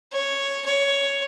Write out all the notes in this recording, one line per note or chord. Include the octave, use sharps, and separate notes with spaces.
C#5
C#5